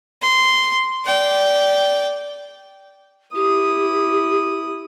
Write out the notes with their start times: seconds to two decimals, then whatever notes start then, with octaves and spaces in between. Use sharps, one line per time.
0.22 C6
1.06 D5 G5
3.35 E4 G4 D#6